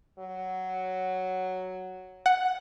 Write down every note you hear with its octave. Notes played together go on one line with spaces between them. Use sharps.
F#3
F#5